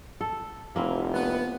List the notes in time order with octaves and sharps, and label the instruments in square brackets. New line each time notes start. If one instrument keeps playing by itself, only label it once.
[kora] A4
[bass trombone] F1 [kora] A#3 C4 E4
[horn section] B3